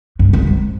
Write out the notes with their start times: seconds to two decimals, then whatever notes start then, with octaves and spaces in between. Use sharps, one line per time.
0.19 G2
0.33 G2
0.47 G#2